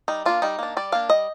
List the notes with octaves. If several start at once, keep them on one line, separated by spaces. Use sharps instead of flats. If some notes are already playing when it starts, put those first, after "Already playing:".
G3 D#4
A#3 D4 F4
G3 D#4
A#3 D4
G3 D5
A#3 D4 F5
G3 D#5